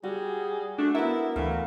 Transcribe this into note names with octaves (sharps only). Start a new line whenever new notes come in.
G3 F#4 G#4
A3 D4 F#4
B3 E4 A#4 E5 F#5
D2 E3 A3 F5